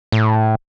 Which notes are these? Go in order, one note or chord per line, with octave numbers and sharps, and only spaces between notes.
A2